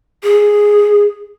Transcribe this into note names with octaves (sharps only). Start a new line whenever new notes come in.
G#4